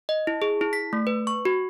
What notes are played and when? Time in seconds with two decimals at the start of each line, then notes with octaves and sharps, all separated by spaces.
0.09 D#5
0.27 E4
0.42 G#4
0.61 E4
0.73 B6
0.93 A3
1.07 B4
1.27 C#6
1.45 F#4